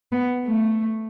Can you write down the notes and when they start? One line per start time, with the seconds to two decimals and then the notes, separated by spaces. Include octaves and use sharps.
0.12 B3
0.45 A3